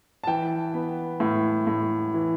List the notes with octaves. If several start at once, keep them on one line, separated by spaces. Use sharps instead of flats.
A5
E3 G5
B3
A2
A2
E3